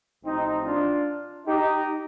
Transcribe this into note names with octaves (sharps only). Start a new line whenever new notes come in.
A1 A2 F3 C4 D#4
D4 F4
D#4 G4